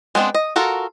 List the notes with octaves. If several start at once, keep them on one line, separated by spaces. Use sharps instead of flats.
G#3 B3 C4 D4
D#5
F4 F#4 A4 A#4